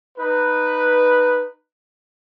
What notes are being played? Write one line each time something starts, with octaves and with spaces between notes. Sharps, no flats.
D#4 B4